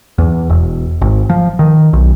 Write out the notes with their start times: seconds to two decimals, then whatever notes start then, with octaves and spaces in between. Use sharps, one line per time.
0.18 E2
0.49 E1
1.01 G#1
1.30 F3
1.59 D#3
1.93 B1